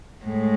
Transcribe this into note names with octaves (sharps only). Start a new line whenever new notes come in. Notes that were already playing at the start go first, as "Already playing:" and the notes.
A2 G#3